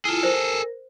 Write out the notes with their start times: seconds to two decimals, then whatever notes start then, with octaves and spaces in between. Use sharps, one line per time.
0.05 E4 F4 G#4 A4
0.23 A#4 C5